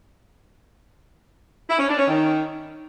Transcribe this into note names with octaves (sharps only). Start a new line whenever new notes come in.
E4
C#4
D4
C#4
D#3